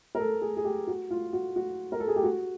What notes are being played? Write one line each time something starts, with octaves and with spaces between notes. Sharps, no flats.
A#4
A4
G#4
G#4
G4
F#4
F4
F#4
F#4
A#4
A4
G#4
G4
F#4